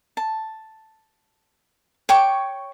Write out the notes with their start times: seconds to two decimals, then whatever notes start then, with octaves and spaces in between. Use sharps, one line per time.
0.17 A5
2.09 C#5 G5 C#6 D6